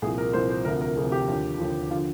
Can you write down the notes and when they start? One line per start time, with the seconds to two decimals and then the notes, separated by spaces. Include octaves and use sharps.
0.02 C2 A#2 F3 G#4
0.18 A#4
0.33 C2 A#2 F3 C5
0.50 C5
0.65 D2 A#4
0.67 C3 F3
0.81 A#4
0.97 D2 C3 F3 G#4
1.12 G4
1.28 D#2 D3 F3
1.59 D#2 D3 F3
1.90 D3 F3 F4